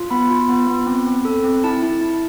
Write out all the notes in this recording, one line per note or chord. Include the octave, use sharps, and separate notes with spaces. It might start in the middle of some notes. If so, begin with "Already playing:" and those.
Already playing: F4
B3 B5
F4
B3
B3
C4
C4
A4
C4
E4 A5
E4
E4